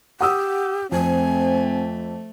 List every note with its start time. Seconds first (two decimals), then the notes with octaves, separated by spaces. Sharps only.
0.21 G4 F#5 D#6 E6
0.92 F2 A3 C4 G#5